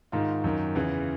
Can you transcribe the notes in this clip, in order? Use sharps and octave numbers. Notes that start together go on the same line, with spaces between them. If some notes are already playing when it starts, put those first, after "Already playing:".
G#2 D#3 F4
F#2 D#3
E2 C#3 E3